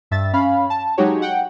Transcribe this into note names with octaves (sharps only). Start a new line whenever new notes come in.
G2 E5 A6
C#4 F5 B5
A5
F#3 G#3 D#4 F#4 G4 C#5
F#5 G5